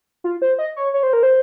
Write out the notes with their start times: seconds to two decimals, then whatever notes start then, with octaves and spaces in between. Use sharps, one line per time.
0.24 F4
0.42 C5
0.59 D#5
0.76 C#5
0.94 C#5
1.03 C5
1.13 A#4
1.23 C5